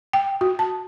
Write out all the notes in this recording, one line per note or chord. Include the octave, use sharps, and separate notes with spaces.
G5
F#4
A5